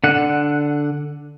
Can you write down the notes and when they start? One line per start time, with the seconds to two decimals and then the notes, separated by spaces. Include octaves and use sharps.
0.04 D3 F#5